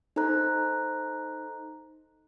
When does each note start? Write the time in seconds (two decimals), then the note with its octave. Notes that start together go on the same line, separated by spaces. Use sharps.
0.16 D#4 A4 C5 A#5 F#6